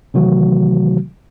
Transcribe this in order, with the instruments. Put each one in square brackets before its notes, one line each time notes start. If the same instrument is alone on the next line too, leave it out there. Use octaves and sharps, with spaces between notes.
[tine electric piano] C3 D#3 E3 F#3 A3 F#4